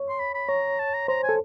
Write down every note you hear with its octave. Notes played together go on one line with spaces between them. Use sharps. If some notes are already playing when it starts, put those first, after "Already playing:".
Already playing: C#5
C6
B5
B5
C#5 A#5
A5
A#5
C5 A#5
G#5
A4